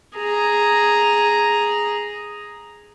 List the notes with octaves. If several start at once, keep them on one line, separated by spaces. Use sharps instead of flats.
G#4 A#5